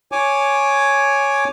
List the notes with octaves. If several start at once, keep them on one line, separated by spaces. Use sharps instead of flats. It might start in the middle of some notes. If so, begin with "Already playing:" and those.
C#5 G#5 D6